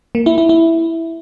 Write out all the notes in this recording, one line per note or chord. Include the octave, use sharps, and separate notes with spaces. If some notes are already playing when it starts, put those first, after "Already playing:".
A#3
E4
E4
E4